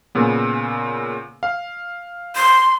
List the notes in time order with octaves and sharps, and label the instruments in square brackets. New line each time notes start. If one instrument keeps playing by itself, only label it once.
[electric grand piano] A#2 C#3 B3
F5
[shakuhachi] C6